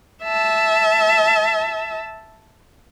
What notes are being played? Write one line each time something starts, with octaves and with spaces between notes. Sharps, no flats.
E5 A5